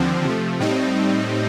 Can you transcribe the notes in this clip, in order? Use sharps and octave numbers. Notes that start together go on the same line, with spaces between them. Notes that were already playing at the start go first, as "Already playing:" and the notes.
Already playing: D#2 D3 F3 C4
C3 F3 A3
A2 G3 C4 D#4